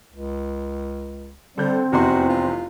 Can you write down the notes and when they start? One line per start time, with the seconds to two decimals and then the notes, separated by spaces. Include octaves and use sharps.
0.12 C#2
1.58 D3 G3 C4 G6
1.92 F1 E2 F#4 C6
2.29 F4